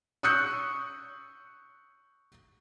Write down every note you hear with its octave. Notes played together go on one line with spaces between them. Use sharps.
C#6 D#6 E6 F#6 G6 C#7